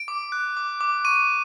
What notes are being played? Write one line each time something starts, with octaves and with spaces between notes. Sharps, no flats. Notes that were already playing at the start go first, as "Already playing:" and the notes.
Already playing: D7
D6
F#6
D6
D6
C#6 D#7